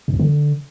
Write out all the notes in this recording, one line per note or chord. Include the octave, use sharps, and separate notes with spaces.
G2
F2
D3